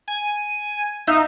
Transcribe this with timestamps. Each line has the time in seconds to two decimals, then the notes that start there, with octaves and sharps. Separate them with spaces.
0.08 G#5
1.08 D#4 E5 F5